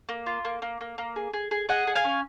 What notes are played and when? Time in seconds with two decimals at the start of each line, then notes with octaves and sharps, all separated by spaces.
0.09 A#3
0.26 F4
0.45 A#3
0.62 A#3
0.81 A#3
0.98 A#3
1.16 G#4
1.33 G#4
1.51 G#4
1.69 G#4 D#5 F#5
1.87 G#4
1.95 F5 G#5
2.04 C#4